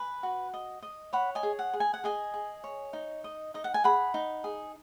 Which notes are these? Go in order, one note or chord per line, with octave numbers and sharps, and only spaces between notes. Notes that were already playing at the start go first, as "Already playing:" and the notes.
Already playing: B4 G#5
F#4
D#5
D#5
C#5 F#5 B5
D#5 G#5
G#4
F#5
G#4
G#5
F#5
G#4 D#5 G#5
G#4
C#5
D#4
D#5
D#4 D#5
F#5
G#5
G#4 F#5 B5
D#4
G#4